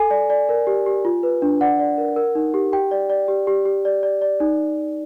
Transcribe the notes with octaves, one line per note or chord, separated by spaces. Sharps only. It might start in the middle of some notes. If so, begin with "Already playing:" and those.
Already playing: A4 G#5
D5
D5
A#4
G4
G4
F4
B4
D4
D5 F#5
D5
A#4
A#4
D#4
G4
G4 G5
D5
D5
G4
G4
G4
D5
D5
D5
D#4